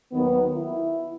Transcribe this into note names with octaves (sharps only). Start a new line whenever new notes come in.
D#2 D#3 F#3 B3
E4